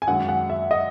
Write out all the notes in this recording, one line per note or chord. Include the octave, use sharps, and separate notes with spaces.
G#5
F#2 D#3 G#3 F#5
F#5
E5
D#5